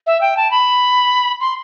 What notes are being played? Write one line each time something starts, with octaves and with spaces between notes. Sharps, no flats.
E5
G5
A5
B5
C6